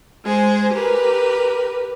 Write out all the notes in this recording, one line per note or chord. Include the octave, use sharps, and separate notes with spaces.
G#3 G#4 C5
G4 A#4 B4